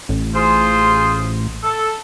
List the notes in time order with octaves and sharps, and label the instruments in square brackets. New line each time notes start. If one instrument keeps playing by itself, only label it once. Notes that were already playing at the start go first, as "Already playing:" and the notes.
[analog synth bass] A1
[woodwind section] F4 G#4 C5
A4